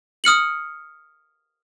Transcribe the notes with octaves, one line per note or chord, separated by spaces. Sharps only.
D#6 F6 C#7 F#7